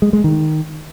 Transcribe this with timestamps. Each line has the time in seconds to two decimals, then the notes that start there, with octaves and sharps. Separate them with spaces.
0.02 G#3
0.13 G#3
0.24 D#3